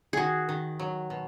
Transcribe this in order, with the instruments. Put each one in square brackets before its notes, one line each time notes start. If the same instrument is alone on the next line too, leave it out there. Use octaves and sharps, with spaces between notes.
[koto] D#3 [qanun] F#4 G#4
[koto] D#3
F#3
B2